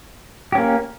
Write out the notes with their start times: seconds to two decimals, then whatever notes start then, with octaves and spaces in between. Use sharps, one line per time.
0.52 G4
0.55 C#4
0.58 A#3